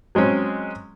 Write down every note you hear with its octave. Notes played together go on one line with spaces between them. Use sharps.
F#3 G#3 C4 C#4